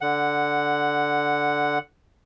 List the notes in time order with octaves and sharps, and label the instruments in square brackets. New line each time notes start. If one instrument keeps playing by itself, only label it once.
[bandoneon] D3 F#5